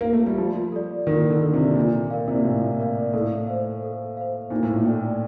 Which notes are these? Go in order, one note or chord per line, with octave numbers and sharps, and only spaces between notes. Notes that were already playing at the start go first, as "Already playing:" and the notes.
A#3
A3
G3
F3 F4
A4 D5
D#3 F4
D3
A4 D5
C3
A#2 F4
A#4 D5 F5
C3
A#2
A2 F4
A#4 D5 F5
A2 A4
C5 F5
A4
C5 F5
A#2 D#4
A2
A#2
A4 D5 G5